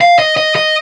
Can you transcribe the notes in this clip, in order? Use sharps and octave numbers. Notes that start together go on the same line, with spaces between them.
F5
D#5
D#5
D#5